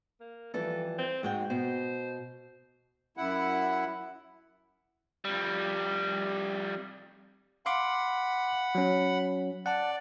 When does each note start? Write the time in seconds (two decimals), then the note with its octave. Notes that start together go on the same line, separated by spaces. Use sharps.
0.20 A#3
0.54 F2 E3 G3 A4
0.98 C4
1.23 G#2 G#3 F#4 G5
1.50 B2 C5
3.17 F#2 E4 F#5
5.25 F2 G3
7.66 F5 F#5 B5 C6 D6
8.75 F#3 C#4
9.66 D5 F#5 A5